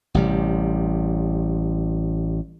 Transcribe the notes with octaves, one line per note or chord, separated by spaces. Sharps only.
A1 C3 G3